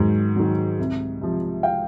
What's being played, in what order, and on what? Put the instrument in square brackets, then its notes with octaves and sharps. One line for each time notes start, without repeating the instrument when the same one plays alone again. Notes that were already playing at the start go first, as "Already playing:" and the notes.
Already playing: [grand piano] G#2 D#3 F#3
D#3 F#3
C2
C3 F3
F5 G5